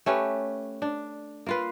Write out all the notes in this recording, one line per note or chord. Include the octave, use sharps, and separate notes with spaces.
A3 C#4 G4 B4
D4
A#3 F4 B4